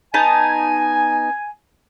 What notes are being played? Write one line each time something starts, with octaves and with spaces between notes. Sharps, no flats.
B3 D#4 G#5 A5